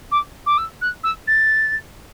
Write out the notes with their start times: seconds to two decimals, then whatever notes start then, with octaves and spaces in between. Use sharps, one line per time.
0.11 D6
0.46 D6
0.58 E6
0.81 F#6
1.04 E6
1.27 A6